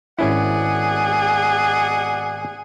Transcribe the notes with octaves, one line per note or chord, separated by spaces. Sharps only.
G#1 B2 C#4 E4 G#4 D5 F#5